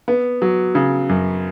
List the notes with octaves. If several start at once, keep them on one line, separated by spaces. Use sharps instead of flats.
B3
F#3
C#3
F#2